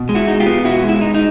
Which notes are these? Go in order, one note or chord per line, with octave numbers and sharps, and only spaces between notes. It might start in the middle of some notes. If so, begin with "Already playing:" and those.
Already playing: B2
G#3
E4 F#4
D#4
F4 G4
B3
B2 E4 F#4
G#3
E4
D#4
D#4